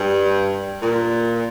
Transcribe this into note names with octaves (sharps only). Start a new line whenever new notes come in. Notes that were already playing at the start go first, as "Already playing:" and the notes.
Already playing: G2
A#2